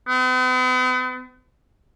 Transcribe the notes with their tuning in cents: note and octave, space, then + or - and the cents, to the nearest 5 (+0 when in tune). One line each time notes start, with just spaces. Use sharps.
B3 +45